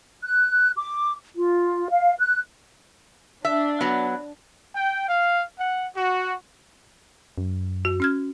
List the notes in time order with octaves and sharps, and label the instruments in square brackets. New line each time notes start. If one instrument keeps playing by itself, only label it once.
[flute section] F#6
D6
F4
F5
F#6
[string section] D4 [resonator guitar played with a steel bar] E5
[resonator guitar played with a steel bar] F#3 B3
[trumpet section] G5
F5
F#5
F#4
[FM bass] F#2
[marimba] F#4
C#4 F6 G#6